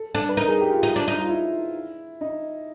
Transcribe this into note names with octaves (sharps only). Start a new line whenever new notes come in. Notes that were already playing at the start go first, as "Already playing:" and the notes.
Already playing: A4
D4 A4
B4
D#4 A#4
G#4
G4
F4
D#4
D4
D#4
F4
E4
D#4